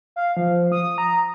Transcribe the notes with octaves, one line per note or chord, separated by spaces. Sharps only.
F5
F3
D#6
A#5